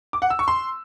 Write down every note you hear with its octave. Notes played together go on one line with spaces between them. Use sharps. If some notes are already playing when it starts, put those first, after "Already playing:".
D6
F#5
E6
C#6
C6